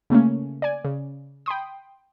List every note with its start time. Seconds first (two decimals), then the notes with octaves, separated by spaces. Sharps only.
0.10 C#3 A3 A#3 C#4
0.62 D5 G#5
0.85 C#3
1.46 G5 B5 C6 D#6